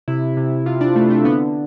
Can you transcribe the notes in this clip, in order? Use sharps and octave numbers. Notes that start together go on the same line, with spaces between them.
C3 E4
C3
C3 F4
D4
C3 A3
A3
D3 B3